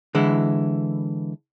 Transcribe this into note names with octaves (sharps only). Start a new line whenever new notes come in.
D3 E3 G#3 E4